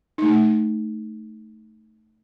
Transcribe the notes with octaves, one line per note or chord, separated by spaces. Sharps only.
A3 D#4